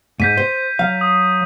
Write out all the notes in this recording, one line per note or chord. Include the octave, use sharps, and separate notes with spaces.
G#2 G6 B6 D#7
C5
F#3 F5
D#6